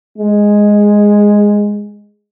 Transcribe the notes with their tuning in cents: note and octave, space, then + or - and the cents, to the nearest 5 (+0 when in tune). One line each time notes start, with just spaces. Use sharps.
G#3 -5